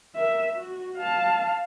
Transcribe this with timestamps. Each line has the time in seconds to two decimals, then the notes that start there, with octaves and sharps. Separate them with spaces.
0.16 A#4 E5
0.54 F#4
0.98 F5 A5